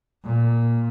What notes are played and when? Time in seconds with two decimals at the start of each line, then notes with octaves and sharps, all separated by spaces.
0.24 A#2